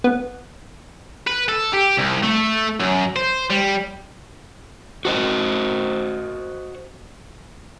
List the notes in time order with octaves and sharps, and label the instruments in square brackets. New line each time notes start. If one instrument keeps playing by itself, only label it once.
[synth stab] B3
[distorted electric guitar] B4
A4
G4
C2
A3
F#2
C5
G3
[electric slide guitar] F#4 C5 D#5